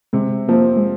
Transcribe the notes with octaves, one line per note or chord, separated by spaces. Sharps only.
C3 G#3
F3 A#3 C4
G#3